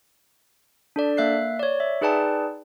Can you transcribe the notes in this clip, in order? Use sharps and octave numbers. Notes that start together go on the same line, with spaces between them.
D4 A4 D5
A#3 E5 F#6 C7
C#5 D5
E5
D#4 G#4 B4 D5 G5 A5